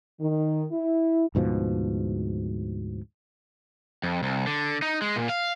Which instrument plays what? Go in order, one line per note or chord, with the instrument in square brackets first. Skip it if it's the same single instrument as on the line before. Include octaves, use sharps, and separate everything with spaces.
[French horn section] D#3
E4
[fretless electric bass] D2 G#2 B2 F3
[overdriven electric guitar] F2
C2
D3
D#4
G#3
A#2
F5